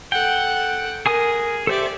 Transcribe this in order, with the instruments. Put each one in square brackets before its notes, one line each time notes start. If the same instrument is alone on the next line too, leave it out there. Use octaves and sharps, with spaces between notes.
[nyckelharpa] A4 F#5 [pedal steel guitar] G5
[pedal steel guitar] G#4 G#5 D#6 [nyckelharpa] A#4
[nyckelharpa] G4 D5 [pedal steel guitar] A4 C5 E5